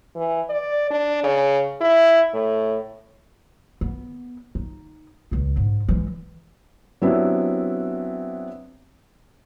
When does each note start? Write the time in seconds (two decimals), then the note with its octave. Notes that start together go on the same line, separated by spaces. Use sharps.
0.15 E3
0.49 D5
0.90 D4
1.23 C#3
1.81 E4
2.33 A2
3.81 B3
4.55 D#4
5.31 C#2 C#3
5.57 G#2
5.89 E3 G#3
7.02 F#3 B3 C4 D4 E4 G4